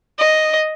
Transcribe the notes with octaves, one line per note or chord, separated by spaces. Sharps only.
D#5